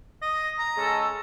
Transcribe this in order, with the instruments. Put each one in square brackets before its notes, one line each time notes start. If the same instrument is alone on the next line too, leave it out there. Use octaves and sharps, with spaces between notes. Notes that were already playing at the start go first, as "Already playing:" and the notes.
[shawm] D#5
A#5
[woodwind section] G#3 C#4 A4